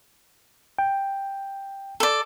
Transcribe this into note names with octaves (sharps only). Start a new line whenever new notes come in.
G5
A4 D5